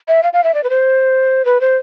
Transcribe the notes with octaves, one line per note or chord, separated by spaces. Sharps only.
E5
F5
F5
E5
D5
B4
C5
B4
C5